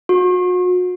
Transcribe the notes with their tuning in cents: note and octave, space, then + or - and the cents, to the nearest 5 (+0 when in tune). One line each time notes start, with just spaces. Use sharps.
F#4 -40